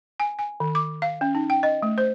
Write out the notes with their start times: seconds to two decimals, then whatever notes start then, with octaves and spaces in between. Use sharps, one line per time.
0.20 G#5
0.39 G#5
0.60 D#3
0.75 D6
1.02 F5
1.21 C#4
1.35 D#4
1.50 G5
1.63 D#5
1.82 A3
1.98 C5